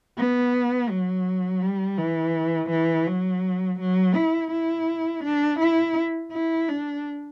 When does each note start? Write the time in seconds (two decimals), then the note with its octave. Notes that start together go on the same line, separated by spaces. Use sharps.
0.17 B3
0.90 F#3
1.62 G3
1.98 E3
2.70 E3
3.07 F#3
3.80 F#3
4.15 E4
4.52 E4
5.24 D4
5.60 E4
6.32 E4
6.68 D4